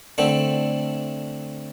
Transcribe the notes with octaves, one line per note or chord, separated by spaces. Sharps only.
D3 A3 C4 E4